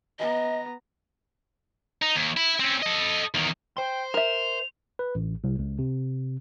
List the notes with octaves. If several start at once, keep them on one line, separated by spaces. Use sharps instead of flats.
B3 D#5 A#5
D#4
D#2
E4
C4 C#4
A4 D#5
E2 D#3
C5 G5 C6
A#4 E5 F7
B4
A1
C2
C#2
C3